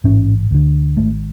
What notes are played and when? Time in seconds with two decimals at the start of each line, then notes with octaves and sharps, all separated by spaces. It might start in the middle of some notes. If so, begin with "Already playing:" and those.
0.04 A1 G#2 C#4
0.51 D2 D3
0.96 G#1 G#2 A3